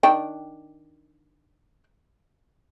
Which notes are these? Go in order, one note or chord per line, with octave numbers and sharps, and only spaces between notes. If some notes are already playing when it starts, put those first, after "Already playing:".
D#3 D4 G5